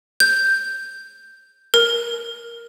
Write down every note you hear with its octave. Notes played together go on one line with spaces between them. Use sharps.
G6
A#4